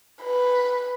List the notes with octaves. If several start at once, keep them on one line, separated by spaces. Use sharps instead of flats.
B4